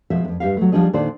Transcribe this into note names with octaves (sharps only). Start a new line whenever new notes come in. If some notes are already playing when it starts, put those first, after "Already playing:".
B2 F3 G#3 E5
F2 G#2
G2 G4 E5 F5
F#3 A3
F3 G3 D4 G#4 D#5
A#2 D#3 D4 A4 C5 D5